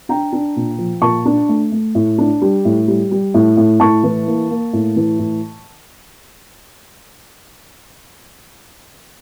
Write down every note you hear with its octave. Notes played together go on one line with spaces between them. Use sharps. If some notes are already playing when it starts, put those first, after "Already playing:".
D4 G5 A#5
D4
A#2
F3
A#2 A5 C#6
D4
A3
A3
A2
D4
G3
A2
G3
G3
A2
A2
A2 A5 C#6
E3
A#3
A#3
A2
E3
A2